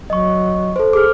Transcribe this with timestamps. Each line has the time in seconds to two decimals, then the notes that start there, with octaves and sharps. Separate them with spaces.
0.10 F#3 D#5 C#6
0.76 A4 C5
0.93 G#4 D6 F6